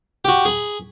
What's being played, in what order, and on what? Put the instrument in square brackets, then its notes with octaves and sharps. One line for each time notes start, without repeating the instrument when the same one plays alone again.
[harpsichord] F#4 G4
G#4 B5